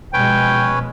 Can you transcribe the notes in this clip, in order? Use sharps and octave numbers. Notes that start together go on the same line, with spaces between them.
B2 F3 G#3 C#4 B4 C#5 G5